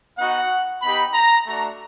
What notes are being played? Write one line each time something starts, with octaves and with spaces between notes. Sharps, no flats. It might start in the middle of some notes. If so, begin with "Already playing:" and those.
B3 D#4 F#4 F#5
B3 D#4 G4 B5
A#5
A3 D4 F#4 A#5